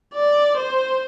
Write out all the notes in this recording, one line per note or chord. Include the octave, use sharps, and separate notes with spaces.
D5
C5